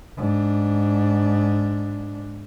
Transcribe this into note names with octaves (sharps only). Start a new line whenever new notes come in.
G#2 D4